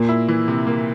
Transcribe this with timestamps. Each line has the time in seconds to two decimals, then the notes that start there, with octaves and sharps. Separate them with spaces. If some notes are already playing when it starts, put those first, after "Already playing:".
Already playing: A#2 A#3
0.09 E4
0.28 E3
0.48 C3
0.67 A#3